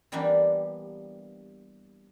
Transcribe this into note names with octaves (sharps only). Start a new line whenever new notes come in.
E3 G3 A#3 B3 D4 G4